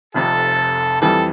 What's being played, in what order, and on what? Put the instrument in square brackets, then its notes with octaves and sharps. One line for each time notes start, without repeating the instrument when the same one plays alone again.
[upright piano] F1 F2 C3 [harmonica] A4
[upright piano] F2 E3 G3 [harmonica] A4